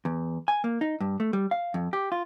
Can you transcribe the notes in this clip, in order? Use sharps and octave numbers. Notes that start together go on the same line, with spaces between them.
E2
G#5
A#3
D#4
G2
A3
G3
F5
F2
G4
F4